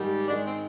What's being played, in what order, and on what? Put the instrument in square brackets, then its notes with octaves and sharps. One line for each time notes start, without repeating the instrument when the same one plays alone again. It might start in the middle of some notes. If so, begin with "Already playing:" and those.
Already playing: [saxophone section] G#2 D#3 G3
G#2 D#3 G#3 D4
C4